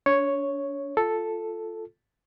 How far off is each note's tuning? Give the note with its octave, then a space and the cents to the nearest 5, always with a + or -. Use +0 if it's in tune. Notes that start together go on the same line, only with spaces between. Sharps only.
D4 -40 C#5 +0
F4 +0 A4 +0